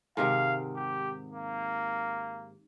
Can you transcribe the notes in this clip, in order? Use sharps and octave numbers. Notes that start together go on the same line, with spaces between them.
G#2 C3 D#3 F5
G4
A#3